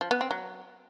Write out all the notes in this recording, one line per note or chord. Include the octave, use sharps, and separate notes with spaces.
F3
B3
C4
F#3